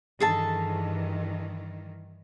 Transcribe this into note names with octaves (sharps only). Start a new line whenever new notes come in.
G2 D#3 E3 G#4 A4 A5